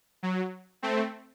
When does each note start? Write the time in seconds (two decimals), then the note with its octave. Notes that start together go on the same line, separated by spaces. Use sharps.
0.23 F#3
0.82 A3 C4